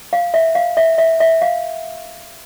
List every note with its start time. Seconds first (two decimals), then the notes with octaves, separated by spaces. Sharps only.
0.13 F5
0.34 E5
0.55 F5
0.77 E5
0.98 E5
1.20 E5
1.42 F5